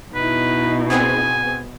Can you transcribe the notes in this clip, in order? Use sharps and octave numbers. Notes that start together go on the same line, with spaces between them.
B2 D#4 E4 B4
B3 C4 G#4 G#5